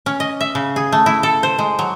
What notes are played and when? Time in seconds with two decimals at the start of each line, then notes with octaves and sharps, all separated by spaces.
0.06 C#4
0.20 D#5
0.41 E5
0.55 C#3
0.76 G#4
0.92 A3
1.06 E4
1.23 A4
1.43 C5
1.59 G#3
1.79 F#3